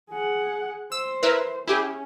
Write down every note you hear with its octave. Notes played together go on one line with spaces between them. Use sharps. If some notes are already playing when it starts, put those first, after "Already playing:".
G#4 F#5
C5 E6
E4 A#4 B4
C#4 E4 G4 G#4